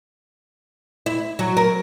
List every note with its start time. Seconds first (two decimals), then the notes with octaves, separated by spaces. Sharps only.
1.06 E4
1.39 F#3
1.57 A#4